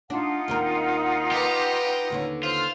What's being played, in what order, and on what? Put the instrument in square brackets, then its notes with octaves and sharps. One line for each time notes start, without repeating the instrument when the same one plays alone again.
[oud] D4 [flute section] D#4 F4 F#5
[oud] D#2 C4 A#4
[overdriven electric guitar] G4 [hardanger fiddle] B4 A#5
[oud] D#2 D3 C#4
[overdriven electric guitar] F4 [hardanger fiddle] C5